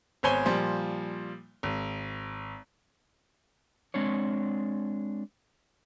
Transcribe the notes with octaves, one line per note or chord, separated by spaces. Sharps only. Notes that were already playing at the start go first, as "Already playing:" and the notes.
G#1 B3 C5 C#5 G#5 G7
A#2 F3 G3
G#1
G#3 C4 D4 C#5